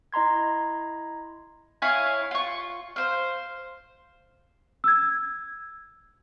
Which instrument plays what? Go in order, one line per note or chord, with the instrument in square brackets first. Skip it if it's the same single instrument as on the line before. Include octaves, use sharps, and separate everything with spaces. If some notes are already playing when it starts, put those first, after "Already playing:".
[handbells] E4 D#5 A#5 C6 G#6
[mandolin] E4 C#5 F5 G#5
F4 C#6
C5 F5
[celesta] E6 G#6